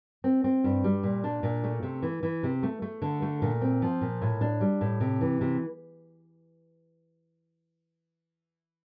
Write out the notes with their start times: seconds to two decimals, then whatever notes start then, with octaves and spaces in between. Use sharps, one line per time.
0.24 C4
0.44 C4
0.64 G2
0.84 G3
1.03 A#2
1.24 D4
1.43 A#2
1.64 A3
1.83 C3
2.02 E3
2.23 E3
2.43 C3
2.63 A3
2.82 A3
3.02 D3
3.22 A3
3.42 A#2
3.61 C4
3.82 F3
4.01 A#2
4.22 A2
4.41 D4
4.61 G3
4.81 A2
5.00 C3
5.21 E3
5.41 C3